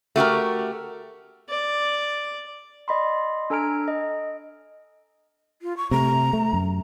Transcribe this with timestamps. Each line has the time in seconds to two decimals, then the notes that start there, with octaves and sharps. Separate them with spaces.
0.16 A3 F#4 G4 A#4
1.49 D5
2.88 D5 D#5 B5 C6
3.50 D4 A4 G#5 A#5 F6 D7
3.88 D#5
5.62 F4
5.77 C#6
5.91 C3 A3 A#5
6.33 A3
6.53 F#2